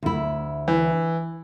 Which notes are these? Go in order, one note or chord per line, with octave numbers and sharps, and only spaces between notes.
D2 E4
E3